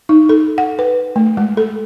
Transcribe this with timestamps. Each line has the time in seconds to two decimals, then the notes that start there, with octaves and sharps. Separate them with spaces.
0.09 D#4
0.29 A4
0.58 F#5
0.79 B4
1.16 A3
1.37 G#3
1.57 A4